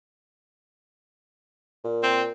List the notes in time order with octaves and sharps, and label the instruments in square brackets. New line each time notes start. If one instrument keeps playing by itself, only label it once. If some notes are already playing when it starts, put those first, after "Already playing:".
[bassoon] A#2
[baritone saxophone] C4